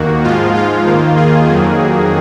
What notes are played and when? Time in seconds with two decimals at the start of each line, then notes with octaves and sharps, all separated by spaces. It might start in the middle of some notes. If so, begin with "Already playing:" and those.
Already playing: D#2 D#3 A#3 F#4
0.24 G#2 F3 G#3 F4
0.55 F4
0.85 D#2 D#3 A#3
1.16 G#4
1.47 F2 D#3 F#3 A#3